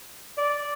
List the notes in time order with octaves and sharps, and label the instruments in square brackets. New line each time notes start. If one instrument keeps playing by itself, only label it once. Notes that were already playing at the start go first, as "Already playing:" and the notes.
[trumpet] D5